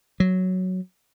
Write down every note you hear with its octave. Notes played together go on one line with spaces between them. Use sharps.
F#3